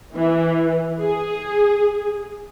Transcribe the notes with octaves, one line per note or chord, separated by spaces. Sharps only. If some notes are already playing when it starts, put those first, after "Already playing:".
E3
G#4